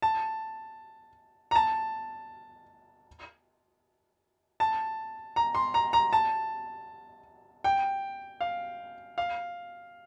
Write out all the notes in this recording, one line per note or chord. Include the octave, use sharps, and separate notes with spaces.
A5
A#5
A5
A5
A#5
C6
A#5
A#5
A5
G5
F5
F5